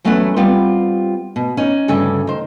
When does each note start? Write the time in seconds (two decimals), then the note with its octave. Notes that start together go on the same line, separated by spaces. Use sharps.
0.05 E2 F#3 A3 B3 C#4 F#5
0.36 G3 B3 C4 F4 G4
1.36 B2
1.57 C#4 D#4
1.88 D2 G2 C#3 D4 A4 G#5
2.27 D#3 C5